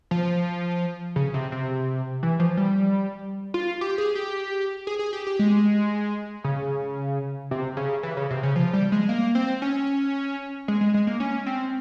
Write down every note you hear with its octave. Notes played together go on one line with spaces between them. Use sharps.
F3
C#3
C3
C3
E3
F3
G3
F4
G4
G#4
G4
G#4
G#4
G4
G4
G#3
C#3
C3
C#3
E3
C#3
C3
C#3
F3
G3
G#3
A#3
C4
C#4
G#3
G#3
G#3
A#3
C#4
C4